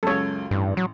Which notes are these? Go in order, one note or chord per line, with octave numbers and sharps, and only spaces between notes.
C#2 F#2 A4 C#5
A1 G2
F#3